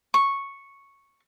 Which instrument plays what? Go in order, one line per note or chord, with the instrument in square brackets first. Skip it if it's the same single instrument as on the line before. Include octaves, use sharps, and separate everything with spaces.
[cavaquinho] C#6